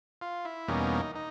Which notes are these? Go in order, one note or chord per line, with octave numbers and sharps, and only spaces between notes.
F4
E4
E2 B2 G3 A#3 C#4 D#4
D#4